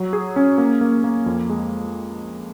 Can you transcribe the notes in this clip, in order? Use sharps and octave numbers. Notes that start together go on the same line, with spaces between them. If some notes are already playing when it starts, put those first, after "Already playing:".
Already playing: F#3
G#4
C#4
A#3
A#3
A#3
F2
G#3